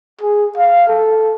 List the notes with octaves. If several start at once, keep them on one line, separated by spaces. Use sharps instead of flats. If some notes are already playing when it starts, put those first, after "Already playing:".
G#4
F5
A4